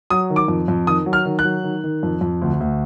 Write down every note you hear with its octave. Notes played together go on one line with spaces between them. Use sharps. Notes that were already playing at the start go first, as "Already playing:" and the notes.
F#3 D#6
D#3
D6
F2
F2
D#3 D#6
F#3
F6
D#3
F#6
F#3
D#3
D#3
F2
F2
D2
D2